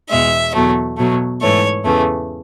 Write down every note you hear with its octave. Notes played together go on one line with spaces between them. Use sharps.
E2 B2 G#3 E5
E2 B2 F#3 A3
B2 F#3 A3
G#2 E3 A3 C#5
E2 C#3 E3 A3